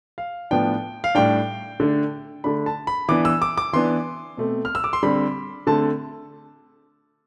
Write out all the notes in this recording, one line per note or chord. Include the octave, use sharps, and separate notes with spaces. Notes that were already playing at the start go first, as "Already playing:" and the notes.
F5
A2 F3 B3 D4 G5
F5
A2 G3 D4 G5
D3 A3 D4
D3 A3 D4 B5
A5
B5
E3 B3 D4 D6
E6
D6
D6
E3 B3 D4 C6
B2 A3 C4
F6
E6
D6
C6
D3 G3 C4 B5
D3 A3 C4 A5